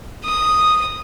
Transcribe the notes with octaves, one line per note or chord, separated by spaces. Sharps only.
D#6